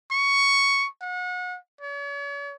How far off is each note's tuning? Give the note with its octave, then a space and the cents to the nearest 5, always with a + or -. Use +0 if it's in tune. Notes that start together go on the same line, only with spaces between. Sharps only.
C#6 +5
F#5 -35
C#5 +45